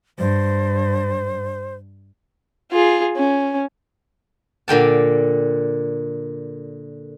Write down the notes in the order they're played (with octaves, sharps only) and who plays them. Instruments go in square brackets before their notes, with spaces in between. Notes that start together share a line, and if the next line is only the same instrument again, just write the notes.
[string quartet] G2 [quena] C5
[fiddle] F4 G#4
C#4
[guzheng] A#2 D3 G5 A5